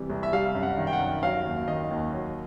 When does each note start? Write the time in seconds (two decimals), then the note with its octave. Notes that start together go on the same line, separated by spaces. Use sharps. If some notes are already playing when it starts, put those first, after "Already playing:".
Already playing: C3 E3 G3
0.10 C2
0.23 E5
0.32 G3 F5
0.55 F#2
0.63 F#5
0.78 D#3
0.87 G5
0.93 F#5
1.00 F#2
1.23 F#3 F5
1.45 D#2
1.68 D#3 D#5
1.91 D#2
2.12 F#3